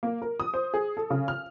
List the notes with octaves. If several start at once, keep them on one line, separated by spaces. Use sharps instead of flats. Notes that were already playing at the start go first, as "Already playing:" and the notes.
A#3
A#4
D#6
C5
G#4
A4
C#3
F6